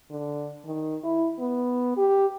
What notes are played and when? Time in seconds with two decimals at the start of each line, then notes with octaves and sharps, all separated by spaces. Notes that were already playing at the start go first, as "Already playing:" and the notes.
0.11 D3
0.65 D#3
1.04 E4
1.39 B3
1.97 G4